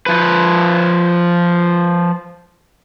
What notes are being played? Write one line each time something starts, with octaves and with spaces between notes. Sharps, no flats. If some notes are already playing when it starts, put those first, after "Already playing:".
F3 B4